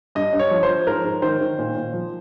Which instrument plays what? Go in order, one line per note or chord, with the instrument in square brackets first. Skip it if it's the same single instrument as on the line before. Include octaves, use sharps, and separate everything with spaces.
[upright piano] G2 D#5
G2
C#5
F3
C5
F3
G#2 A#4
G#2
D#3 C5
D#3
A#2
A#2
F3